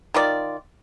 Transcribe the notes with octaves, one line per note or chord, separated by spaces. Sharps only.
D#3 F4 D5